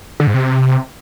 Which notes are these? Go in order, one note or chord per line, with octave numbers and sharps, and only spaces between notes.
D3
G#2
C3